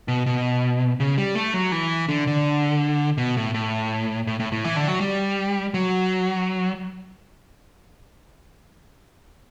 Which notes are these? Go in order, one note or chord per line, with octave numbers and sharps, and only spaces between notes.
B2
B2
C#3
G3
A3
F#3
E3
D3
D3
B2
A2
A2
A2
A2
A2
E3
D3
F#3
G3
F#3